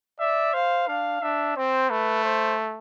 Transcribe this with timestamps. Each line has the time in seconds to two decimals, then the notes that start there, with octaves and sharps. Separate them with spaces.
0.20 D5 E5
0.53 C5 F5
0.88 D4 F5
1.22 D4 E5
1.56 C4 C5
1.90 A3 B4
2.25 C5